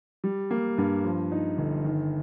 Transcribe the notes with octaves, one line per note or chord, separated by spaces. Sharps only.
G3
A#3
G2
F3
D#4
G1
D#3